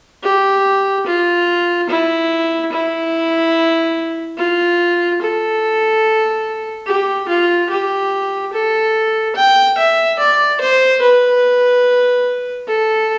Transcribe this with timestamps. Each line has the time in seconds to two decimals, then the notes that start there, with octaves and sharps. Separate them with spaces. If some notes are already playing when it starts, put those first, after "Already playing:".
0.23 G4
1.07 F4
1.89 E4
2.72 E4
4.38 F4
5.22 A4
6.87 G4
7.29 F4
7.70 G4
8.53 A4
9.36 G5
9.78 E5
10.19 D5
10.61 C5
11.02 B4
12.68 A4